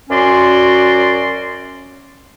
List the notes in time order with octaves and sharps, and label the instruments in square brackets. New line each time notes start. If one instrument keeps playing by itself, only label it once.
[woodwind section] F#2 C#4 F#4 D5 C6